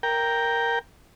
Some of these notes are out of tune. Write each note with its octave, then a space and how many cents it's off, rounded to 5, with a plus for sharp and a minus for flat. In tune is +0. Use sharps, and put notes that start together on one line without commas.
A#4 +0 G5 +0